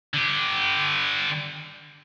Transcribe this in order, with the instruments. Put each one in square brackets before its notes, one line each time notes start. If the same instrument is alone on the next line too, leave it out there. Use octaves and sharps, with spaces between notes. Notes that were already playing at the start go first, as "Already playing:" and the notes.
[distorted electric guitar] D3 G4